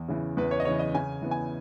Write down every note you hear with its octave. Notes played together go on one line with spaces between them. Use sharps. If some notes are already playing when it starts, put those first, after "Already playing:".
Already playing: E2
C#3 E3
E2 B4
C#5
D#5
C#3 E3 C#5
D#5
C#3 G#5
E3 B3
G#5